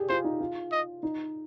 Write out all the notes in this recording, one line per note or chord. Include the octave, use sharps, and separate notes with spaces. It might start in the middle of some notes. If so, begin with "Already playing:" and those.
Already playing: G4 G#4
F4 C5
D#4
F4
D#5
D#4